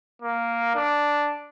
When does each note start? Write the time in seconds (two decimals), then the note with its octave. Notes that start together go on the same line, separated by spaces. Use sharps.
0.22 A#3
0.75 D4